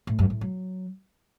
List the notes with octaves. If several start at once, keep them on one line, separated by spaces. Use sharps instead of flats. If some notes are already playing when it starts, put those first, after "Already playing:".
A2
F#2
A2
F#3